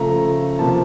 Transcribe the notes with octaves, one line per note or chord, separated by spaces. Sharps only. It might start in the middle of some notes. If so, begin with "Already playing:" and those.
Already playing: C#3 F3 A3 A#5
C3 F3 A#3 A5